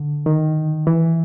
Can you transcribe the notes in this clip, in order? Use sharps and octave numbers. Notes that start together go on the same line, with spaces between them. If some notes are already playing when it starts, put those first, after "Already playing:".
Already playing: D3
D#3
E3